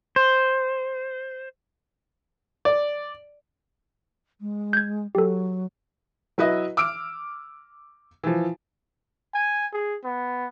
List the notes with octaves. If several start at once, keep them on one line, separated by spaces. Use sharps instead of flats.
C5
D5
G#3
G6 G#6
F#3 G4 A4
F#3 E4 B4 D#5 E5
D6 E6 F6 D7
E3 F3
G#5
G#4
B3